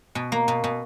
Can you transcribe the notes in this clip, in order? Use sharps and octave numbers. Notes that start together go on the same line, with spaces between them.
B2
A#3
B2
B2